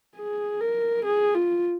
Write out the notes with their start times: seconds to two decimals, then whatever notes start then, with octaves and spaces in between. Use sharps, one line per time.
0.17 G#4
0.61 A#4
1.05 G#4
1.34 F4